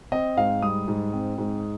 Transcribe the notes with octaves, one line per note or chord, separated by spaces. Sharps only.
C4 D#5
G#2 F5
G3 D#6
G#2
C4
G#2